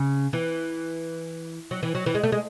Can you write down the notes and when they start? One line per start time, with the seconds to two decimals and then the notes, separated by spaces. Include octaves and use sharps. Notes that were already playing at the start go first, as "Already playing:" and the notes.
Already playing: C#3
0.33 E3
1.71 F#3
1.83 E3
1.95 F#3
2.06 E3
2.15 G#3
2.24 A3
2.32 G#3